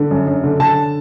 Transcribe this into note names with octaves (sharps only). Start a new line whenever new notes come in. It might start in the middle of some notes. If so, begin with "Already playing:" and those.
Already playing: D3
F#2
F#2
D3
D3 A5